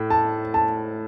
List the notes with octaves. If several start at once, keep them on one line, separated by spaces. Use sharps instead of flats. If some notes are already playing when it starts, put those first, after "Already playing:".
Already playing: A2
A5
A5